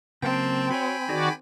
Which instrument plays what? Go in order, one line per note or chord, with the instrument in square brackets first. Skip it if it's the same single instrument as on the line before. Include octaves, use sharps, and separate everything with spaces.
[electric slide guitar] C#3 F#3 A#3 [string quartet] C4 [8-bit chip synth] G5 A5
[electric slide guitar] F#4 C5 C#5 [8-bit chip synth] G5 G#5 B5
[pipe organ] D#3 F#4 D5 [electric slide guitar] D#4 G#4